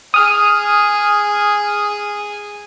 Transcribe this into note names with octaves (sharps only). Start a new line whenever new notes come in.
G#4 D#6 F6